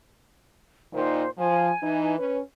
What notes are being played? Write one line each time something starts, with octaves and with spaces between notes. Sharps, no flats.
A#2 D#3 C5
F3 G#5
E3 D#4
C#4 B4